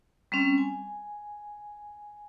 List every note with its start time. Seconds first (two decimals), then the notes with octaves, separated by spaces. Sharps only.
0.32 G3 C4 C#4
0.58 G#5